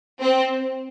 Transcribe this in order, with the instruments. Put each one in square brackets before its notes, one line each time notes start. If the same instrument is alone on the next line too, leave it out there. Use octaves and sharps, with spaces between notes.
[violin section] C4